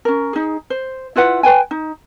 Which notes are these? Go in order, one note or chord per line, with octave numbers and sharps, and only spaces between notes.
C#4 A#4
D#4 G#4
C5
E4 F4 B4 F#5
B4 G5 G#5
D#4